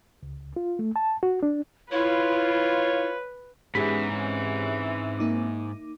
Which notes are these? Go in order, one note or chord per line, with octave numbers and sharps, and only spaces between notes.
C#2
F4
A3
A5
F#4
D4
E4 F4 B4 C#5
G#2 E3 B3 C#4 G4 G#4 C#5 B5
C4 C#4
A#3 D#4 D6